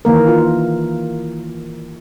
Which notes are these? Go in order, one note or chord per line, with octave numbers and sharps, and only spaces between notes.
D#3 E3 A#3 A#4
F4